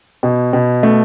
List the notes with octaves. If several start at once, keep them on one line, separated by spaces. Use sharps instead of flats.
B2
B2
A3